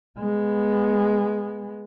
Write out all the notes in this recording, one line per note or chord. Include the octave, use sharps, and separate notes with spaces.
G#3 B3